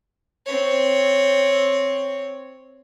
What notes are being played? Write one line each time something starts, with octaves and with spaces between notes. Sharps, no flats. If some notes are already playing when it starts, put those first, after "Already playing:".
C4 C#5